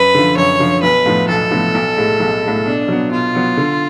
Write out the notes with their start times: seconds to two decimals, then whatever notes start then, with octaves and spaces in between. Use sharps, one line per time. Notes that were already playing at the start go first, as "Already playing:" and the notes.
Already playing: F#2 B4
0.14 D3 F3
0.37 F#2 C#5
0.60 D3 F3
0.83 B1 B4
1.06 A2 F3 B3
1.29 B1 A4
1.51 A2 F3 B3
1.75 B1
1.97 A2 G#3
2.20 B1
2.43 A2 G#3
2.66 B2 D4
2.88 F#3 B3
3.11 B2 F4
3.35 F#3 B3
3.57 D3